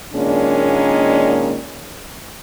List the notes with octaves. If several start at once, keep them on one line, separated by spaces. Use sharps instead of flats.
A#2 D#3 G#3 A#3 C#4 D4